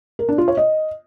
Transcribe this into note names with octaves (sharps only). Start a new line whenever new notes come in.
A#4
D4
F4
C#5
D#5